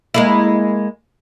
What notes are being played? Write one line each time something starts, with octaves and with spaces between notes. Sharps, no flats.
G#3 A#3 E4